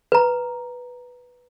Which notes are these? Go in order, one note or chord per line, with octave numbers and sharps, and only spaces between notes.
B4 A#5